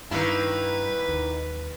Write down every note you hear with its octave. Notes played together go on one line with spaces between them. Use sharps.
G2 D#3 A#3 E4 B4
D#2